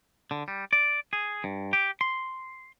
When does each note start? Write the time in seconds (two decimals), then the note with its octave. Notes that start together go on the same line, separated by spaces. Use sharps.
0.31 D3
0.48 G3
0.73 D5
1.13 G#4
1.44 G2
1.73 G4
2.01 C6